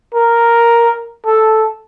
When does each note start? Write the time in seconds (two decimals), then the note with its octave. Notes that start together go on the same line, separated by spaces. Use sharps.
0.15 A#4
1.26 A4